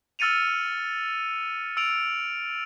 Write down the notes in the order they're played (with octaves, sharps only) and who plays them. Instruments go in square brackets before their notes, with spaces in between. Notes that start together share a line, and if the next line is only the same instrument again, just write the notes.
[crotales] E6 F6 A6 C#7 D#7 F7
E6 D7 F7